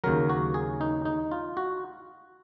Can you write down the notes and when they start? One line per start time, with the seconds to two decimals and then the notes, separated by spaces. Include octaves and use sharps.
0.04 D#2 C#3 F#3 A#4
0.29 F#4
0.54 G#4
0.81 D#4
1.05 D#4
1.31 F4
1.57 F#4